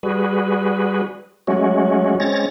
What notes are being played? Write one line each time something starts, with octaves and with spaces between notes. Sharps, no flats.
G3 F#4 G#4 B4
F#3 G#3 A3 C#4 F#4
G#3 C4 C#4 C#5 A6 A#6